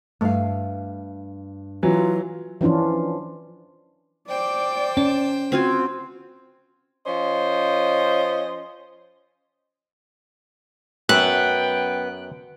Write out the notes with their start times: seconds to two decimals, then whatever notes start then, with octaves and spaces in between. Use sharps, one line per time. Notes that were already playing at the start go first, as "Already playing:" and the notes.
0.21 G2 A3 F5
1.83 E3 F#3 F4
2.61 E3 F3 C#4 D4 F4
4.29 C5 D5 G5
4.97 C#4 A5
5.52 C4 F4 F#4 G#5
7.06 F3 C#4 C5 D#5
11.09 F#2 B3 E5 G5 F#6